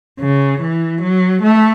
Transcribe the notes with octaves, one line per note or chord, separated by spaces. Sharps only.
C#3
E3
F#3
A3